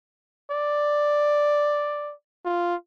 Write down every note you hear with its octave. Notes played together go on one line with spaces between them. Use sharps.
D5
F4